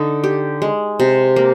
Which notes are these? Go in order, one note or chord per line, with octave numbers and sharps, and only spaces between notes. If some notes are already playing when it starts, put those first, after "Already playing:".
Already playing: D3 D#4
G4
G#3
C3
A#3